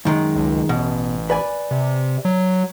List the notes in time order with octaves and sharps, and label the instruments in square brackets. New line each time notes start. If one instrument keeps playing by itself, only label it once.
[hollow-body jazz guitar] F#2 D#3 G#3
[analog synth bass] C#2
[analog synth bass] A1 [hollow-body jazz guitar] B2
[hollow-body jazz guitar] B4 D5 G#5
[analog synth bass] C3
F#3